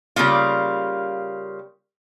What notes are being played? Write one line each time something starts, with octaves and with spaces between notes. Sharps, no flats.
C#3 G3 A#3 F4